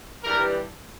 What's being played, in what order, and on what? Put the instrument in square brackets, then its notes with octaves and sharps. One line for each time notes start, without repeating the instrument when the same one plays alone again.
[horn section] G2 E3 G3 A#4